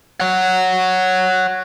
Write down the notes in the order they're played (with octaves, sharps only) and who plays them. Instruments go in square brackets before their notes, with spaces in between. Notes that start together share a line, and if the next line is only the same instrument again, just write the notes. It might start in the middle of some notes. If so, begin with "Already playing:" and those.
[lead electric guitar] C#5 F#5